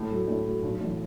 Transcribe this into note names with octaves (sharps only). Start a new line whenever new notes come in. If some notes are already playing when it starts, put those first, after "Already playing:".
Already playing: A2
F#3 A3
A2
F#3 A3
B1
A2 E3 B3